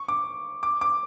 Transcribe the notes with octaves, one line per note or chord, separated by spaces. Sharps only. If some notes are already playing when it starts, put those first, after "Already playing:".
Already playing: C#6
D6
D6
D6